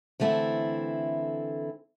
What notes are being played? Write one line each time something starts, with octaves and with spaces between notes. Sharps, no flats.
D3 E3 A3 C4 E4